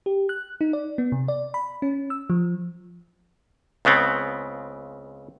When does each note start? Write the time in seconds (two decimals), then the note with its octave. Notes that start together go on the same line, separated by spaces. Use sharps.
0.06 G4
0.29 F#6
0.61 D#4
0.73 D5
0.98 B3
1.12 C3
1.28 D5
1.54 B5
1.82 C#4
2.10 E6
2.30 F3
3.85 C#2 C#3 B3 C4